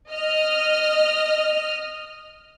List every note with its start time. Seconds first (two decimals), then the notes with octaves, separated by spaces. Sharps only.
0.11 D#5 F6